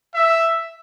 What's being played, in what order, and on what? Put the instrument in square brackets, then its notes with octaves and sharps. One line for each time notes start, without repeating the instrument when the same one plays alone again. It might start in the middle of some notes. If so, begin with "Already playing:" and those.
[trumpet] E5